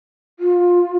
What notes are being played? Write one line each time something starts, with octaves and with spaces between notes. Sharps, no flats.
F4